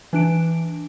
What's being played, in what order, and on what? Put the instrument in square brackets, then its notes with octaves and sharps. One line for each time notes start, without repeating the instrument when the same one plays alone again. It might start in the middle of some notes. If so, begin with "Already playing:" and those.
[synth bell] E3 D4 D7